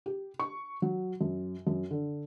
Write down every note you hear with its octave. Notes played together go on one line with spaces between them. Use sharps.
G4
C#6
F#3
F#2
F#2
D3